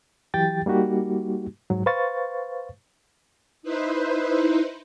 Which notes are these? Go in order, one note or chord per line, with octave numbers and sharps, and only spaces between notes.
E3 F#3 G4 G5 A6
G3 A#3 D#4 F#4 G4
G#2 F#3
B4 C5 F5 C#6 A6
D#4 E4 B4 C5